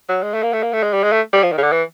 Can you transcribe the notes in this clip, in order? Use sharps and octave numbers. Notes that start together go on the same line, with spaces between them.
F#3
G#3
A3
A#3
A3
A#3
A3
G#3
G3
G#3
A3
G3
F3
D#3
C#3
D3
E3